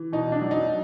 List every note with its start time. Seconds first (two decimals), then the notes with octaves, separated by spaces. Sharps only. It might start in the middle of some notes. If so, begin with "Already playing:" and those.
Already playing: E3
0.13 B2 D#4
0.32 D4
0.41 F#3
0.51 D#4